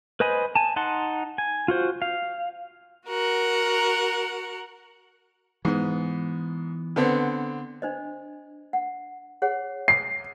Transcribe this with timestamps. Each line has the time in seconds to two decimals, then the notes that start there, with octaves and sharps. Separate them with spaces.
0.20 B4 C5 D#5 G#5 B5
0.56 G#5 A5
0.76 D#4 F#5 A5 C6
1.38 G#5
1.68 F4 F#4 C5
2.02 F5
3.06 F#4 A#4 F#5
5.65 G#2 E3 B3
6.96 D3 B3 C4
7.82 D4 C5 D#5
8.73 F#5
9.42 G#4 C#5 F#5
9.88 C7